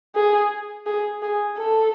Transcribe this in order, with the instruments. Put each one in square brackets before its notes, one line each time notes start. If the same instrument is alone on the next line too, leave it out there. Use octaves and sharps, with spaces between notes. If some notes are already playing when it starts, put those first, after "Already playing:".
[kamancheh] G#4
G#4
G#4
A4